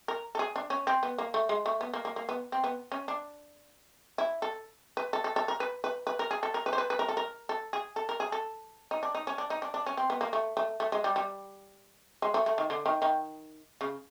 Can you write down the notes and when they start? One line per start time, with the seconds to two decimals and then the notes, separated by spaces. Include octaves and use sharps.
0.08 A#4
0.35 A4
0.39 G#4
0.56 D4
0.70 C#4
0.87 C4
1.03 B3
1.18 A#3
1.34 A3
1.49 G#3
1.66 A3
1.81 B3
1.94 A#3
2.05 A#3
2.16 A#3
2.29 B3
2.52 C4
2.64 B3
2.92 C#4
3.08 D4
4.18 E4
4.42 A4
4.97 B4
5.13 A4
5.24 A4
5.36 A4
5.48 A#4
5.60 B4
5.84 B4
6.07 B4
6.19 A#4
6.31 G#4
6.43 A4
6.54 A#4
6.66 B4
6.73 C5
6.78 B4
6.90 B4
6.99 A#4
7.08 A4
7.17 A#4
7.49 A4
7.73 G#4
7.96 A4
8.09 A#4
8.20 G#4
8.32 A4
8.91 D#4
9.03 D4
9.15 D#4
9.27 C#4
9.38 D4
9.50 D#4
9.62 D4
9.74 D4
9.86 C#4
9.97 C4
10.10 B3
10.21 A#3
10.33 A3
10.57 A3
10.80 A3
10.92 G#3
11.04 G3
11.16 G3
12.22 G#3
12.34 A3
12.46 A3
12.58 D#3
12.70 D3
12.86 D#3
13.02 D#3
13.81 C#3